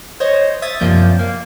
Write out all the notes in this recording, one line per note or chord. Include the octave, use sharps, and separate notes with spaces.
C5 C#5 D#5
E5 D#6 G#6 A6
F#2 C3 F3 A#3 D5 G6
A#3